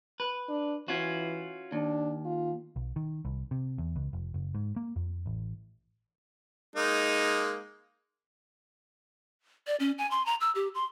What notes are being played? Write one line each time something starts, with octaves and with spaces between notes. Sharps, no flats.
B4
D4
E3 C#4 F4 F#4
D#2 D4
F4
B1
D#3
C2
C3
E2
C#2
F1
F#1
G#2
A#3
F2
A1
G#3 A#3 D#4
D5
C#4
G#5
C6
A#5
E6
G4
C6